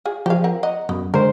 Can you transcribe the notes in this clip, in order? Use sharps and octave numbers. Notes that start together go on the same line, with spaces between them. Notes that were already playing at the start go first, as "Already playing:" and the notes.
F4 G#4
F3 G4 G#4 F5
C4 A#4 F#5
D#5 F#5 A#5
F#2 B3
D3 G#3 A#4 C5